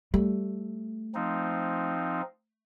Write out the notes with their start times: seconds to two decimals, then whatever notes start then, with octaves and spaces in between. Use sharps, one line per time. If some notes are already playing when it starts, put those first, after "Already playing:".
0.14 G3 A3
1.15 F3 C4 D#4